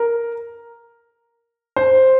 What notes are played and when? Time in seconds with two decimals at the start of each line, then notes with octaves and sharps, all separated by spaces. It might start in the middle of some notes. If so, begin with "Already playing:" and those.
Already playing: A#4
1.76 C5